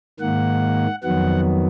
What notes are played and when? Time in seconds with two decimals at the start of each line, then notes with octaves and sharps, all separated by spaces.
0.20 G#2 D#3 A#3 F#5
1.03 F2 D#3 F#3 B3 F#5